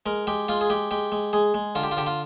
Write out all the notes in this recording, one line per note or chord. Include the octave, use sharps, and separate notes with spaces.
G#3 A#4
G#3 G4
G#3 F4
G#4
G#3 G4
G#3 G4
G#3
G#3 G#4
G#3
D3 F4
G4
F4
D3 G4
F4